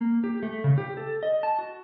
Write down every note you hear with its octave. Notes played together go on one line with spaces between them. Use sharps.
A#3
G4
A3
C#3
G4
A4
D#5
A5
F#4